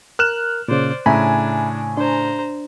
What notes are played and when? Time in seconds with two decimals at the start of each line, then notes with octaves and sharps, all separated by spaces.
0.19 A#4 F6 F#6 E7
0.68 A#2 C#3 C5 D5
1.06 A2 C#3 D4 E5 G#5 A#5 B5
1.97 D4 C5 A#5